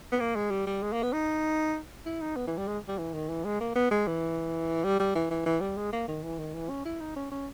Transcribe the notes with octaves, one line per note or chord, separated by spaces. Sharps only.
B3
A#3
G#3
G3
G3
G#3
A#3
B3
D#4
E4
D#4
B3
E3
G3
G#3
G3
E3
D#3
E3
G#3
A#3
B3
G#3
E3
G3
G3
E3
E3
E3
G3
G#3
A#3
D#3
E3
D#3
E3
C#4
E4
D#4
C#4
C#4